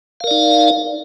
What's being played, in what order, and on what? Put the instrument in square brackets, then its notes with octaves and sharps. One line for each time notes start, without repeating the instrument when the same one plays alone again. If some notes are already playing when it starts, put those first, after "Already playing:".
[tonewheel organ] F5
A#4
D5
D#4